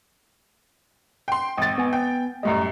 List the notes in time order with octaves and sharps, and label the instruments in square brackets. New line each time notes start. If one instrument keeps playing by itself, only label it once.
[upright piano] G5 C6
[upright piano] G#1 A6 [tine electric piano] G5
[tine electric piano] B3 G#5
[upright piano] G5
[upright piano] F#2 A2 G3 [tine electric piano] D#5 A#5